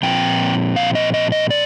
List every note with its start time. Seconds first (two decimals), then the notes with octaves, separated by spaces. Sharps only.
0.03 A#2 F3 C4 G5
0.76 F5
0.95 D#5
1.14 D#5
1.32 D#5
1.50 D5